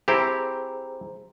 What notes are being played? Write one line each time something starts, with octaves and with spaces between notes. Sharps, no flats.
C4 E4 G4 G#4 C5 A#5